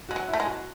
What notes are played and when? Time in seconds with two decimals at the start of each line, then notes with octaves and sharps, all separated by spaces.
0.09 G#3 F#4
0.16 F#3
0.28 E4
0.34 A3
0.40 G#3
0.46 F#4